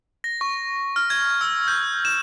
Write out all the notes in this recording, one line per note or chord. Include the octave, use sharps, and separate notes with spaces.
A#6
C#6
F6
G#6
E6
G6
E7